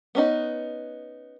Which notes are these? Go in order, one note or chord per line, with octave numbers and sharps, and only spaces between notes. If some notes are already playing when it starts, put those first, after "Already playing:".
B3 C#4 D#4